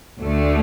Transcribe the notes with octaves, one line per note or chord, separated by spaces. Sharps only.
D2 D3 A3